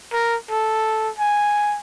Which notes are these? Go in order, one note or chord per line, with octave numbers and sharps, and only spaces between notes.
A#4
A4
G#5